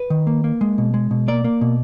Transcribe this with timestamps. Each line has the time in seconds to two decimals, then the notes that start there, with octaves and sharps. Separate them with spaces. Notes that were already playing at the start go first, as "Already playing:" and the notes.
Already playing: B4
0.10 D#3
0.27 A#3
0.44 A#3
0.61 G#3
0.78 B2
0.94 G#3
1.11 B2
1.28 A#3 D5
1.44 A#3
1.61 B2